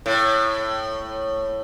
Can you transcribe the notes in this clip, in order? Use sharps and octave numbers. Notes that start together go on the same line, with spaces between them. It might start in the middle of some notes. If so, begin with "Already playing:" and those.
A2